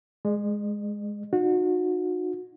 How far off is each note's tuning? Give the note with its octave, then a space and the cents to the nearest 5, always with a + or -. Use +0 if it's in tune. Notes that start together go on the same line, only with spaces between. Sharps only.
G#3 +0 D#5 -40
D#4 -30 F#4 -30